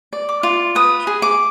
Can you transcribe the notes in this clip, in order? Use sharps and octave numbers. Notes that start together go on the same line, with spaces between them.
D5
D6
F4
B4 D#6
G#4
D6